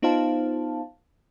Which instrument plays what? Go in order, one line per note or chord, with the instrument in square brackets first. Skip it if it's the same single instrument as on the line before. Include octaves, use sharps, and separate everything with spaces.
[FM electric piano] B3 D#4 F4 C5 F5 A5